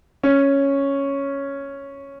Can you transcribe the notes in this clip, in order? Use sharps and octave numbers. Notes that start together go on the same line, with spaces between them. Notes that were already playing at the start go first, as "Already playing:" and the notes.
C#4